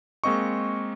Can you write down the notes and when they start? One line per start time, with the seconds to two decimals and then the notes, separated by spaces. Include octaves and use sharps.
0.24 G#3 A#3 C4 D#5 C#6